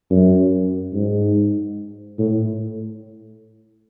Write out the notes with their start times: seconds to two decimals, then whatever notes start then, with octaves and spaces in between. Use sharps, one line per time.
0.10 F#2
0.93 G#2
2.18 A2